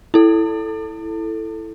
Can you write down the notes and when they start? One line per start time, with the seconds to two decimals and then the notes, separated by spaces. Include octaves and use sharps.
0.14 E4 A4